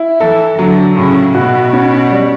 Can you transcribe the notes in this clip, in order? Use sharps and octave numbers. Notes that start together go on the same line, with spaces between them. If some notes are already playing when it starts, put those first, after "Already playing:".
Already playing: E4
E3 A4
D3 F#3
A2 C#3
B2 F#4
C#4
G3